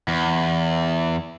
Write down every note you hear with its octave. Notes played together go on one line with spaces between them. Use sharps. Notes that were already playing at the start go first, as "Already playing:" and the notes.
E2